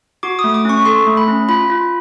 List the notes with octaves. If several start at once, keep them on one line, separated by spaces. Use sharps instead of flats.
F#4 D6
D#6
A3
D6
C#4 C#6
A4 C6
A3
B5
C#4
F4 B5
F4